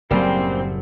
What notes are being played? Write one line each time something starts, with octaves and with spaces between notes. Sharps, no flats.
F#1 A2 C#3 F#3 G3 A#3 C4 C5